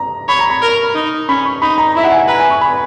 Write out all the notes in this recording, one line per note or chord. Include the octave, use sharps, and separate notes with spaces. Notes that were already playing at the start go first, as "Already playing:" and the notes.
Already playing: A#5
C#5 B5
A#5
B5
A#4
D#4
C#4 B5
C#6
D#4 B5
A#5
E4 E5
F#5
G#5
B4 A#5
G#5
C#6
B5